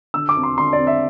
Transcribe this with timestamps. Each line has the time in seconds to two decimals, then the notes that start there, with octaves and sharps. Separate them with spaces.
0.14 D3 E6
0.29 D6
0.36 C4
0.43 C6
0.58 D3 C6
0.73 D5
0.79 C4
0.87 E5